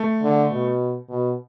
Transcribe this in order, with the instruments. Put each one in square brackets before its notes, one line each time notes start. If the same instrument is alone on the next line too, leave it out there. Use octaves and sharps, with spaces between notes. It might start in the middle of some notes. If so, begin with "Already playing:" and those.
Already playing: [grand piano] A3
[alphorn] D3
B2
B2